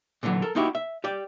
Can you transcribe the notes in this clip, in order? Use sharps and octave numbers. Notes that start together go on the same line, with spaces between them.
A#2 D3 E3 F#3
A4 A#4
A#3 D#4 E4 F#4 G4
E5
G4 D5